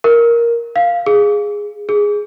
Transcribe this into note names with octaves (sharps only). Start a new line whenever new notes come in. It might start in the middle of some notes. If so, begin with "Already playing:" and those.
A#4
F5
G#4
G#4